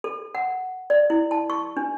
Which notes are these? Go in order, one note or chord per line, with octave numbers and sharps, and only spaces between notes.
A4
F#5
D5
E4
A5
C#6
D4